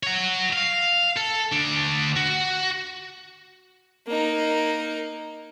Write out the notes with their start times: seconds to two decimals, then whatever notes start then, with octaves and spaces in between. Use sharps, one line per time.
0.03 F#4 C#5
0.53 F5
1.16 A4
1.52 D2 D4
2.16 F#4
4.07 A#3 D#4